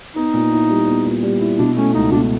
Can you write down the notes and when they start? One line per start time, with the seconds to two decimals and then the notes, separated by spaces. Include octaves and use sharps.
0.16 B3 D#4
0.34 A#2
0.52 E4
0.70 G3
0.88 B3
1.05 A#2
1.23 G3
1.41 E4
1.58 B2 D4
1.76 A3 C#4
1.94 C#2 D#4
2.11 B2 D4